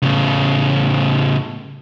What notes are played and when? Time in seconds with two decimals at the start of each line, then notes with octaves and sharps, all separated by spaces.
0.02 A2 C#3